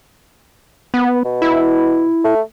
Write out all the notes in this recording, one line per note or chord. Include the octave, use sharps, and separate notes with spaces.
B3
B2
E4
A3